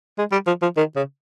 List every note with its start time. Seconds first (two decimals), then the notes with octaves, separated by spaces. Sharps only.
0.19 G#3
0.32 G3
0.47 F3
0.63 F3
0.77 D#3
0.96 C#3